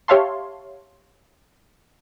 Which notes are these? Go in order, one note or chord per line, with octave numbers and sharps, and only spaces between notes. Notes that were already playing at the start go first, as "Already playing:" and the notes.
G4 C#5 E5 F5 A5 C6